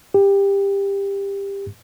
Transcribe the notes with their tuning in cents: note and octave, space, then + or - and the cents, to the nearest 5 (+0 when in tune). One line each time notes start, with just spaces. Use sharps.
G4 +20